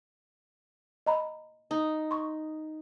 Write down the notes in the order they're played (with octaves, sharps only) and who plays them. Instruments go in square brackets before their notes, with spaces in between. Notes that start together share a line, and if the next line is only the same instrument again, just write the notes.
[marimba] D#5 A#5 B5
[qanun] D#4
[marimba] C6 C#6